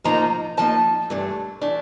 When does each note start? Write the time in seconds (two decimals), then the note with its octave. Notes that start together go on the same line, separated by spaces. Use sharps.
0.04 A2 F3 A#3 D#4 A#5
0.57 A2 F3 A#3 D#4 A5
1.10 G2 E3 A3 D4
1.62 E3 A3 D4